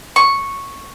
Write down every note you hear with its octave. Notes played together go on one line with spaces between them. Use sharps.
C#6